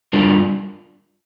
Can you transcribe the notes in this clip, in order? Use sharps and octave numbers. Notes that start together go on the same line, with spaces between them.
G3 D4 F4 A#4 D5